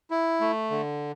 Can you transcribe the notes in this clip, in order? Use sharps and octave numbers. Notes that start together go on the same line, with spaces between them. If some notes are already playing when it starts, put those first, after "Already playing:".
E4
A3
D3